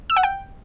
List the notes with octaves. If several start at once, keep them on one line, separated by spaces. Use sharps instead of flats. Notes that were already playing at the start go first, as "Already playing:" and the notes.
E6
F#5
G5